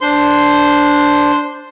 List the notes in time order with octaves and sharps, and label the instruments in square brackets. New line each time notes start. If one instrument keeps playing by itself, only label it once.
[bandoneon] D4 C5 C6